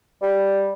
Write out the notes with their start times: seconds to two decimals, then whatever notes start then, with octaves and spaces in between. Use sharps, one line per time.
0.22 G3